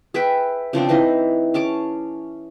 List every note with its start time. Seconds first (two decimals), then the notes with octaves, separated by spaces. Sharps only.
0.14 G#4 B4 E5 G5
0.73 C#3 F3 C4 D4
0.89 E3 D#4 C5 D#5
1.54 C#4 G#4 A5 D6